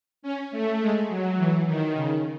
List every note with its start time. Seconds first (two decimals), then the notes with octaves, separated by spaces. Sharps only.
0.22 C#4
0.51 A3
0.80 G#3
1.09 F#3
1.38 E3
1.65 D#3
1.95 C#3